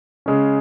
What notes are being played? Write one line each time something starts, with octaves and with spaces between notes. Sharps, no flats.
C#3 G#3 C#4